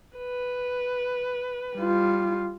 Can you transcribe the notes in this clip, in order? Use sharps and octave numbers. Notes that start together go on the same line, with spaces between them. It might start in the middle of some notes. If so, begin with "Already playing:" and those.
B4
G3 F4